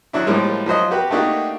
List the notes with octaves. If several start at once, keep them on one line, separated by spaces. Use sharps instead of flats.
D#3 F#3 D4 E4
A2 F3 G3 G#3 A#3
F3 F#3 C5 D#5
F#4 G4 B4
A3 A#3 D4 D#4 F#4 G4